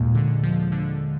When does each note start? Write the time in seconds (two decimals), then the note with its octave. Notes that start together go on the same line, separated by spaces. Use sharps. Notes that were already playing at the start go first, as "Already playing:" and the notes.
Already playing: D#2 A#2 G#3
0.15 D3
0.43 F3
0.72 D3